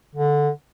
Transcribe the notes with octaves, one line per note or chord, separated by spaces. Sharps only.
D3